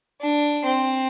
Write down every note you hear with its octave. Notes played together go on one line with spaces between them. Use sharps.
D4
C4